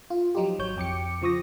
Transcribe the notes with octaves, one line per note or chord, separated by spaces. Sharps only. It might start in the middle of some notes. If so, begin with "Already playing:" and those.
F4
F3 F#3 D#4 F4 G4
G#1 F#3 C#5 G6
F2 G5 D6 C#7
C#3 F3 C#6 D#6 A#6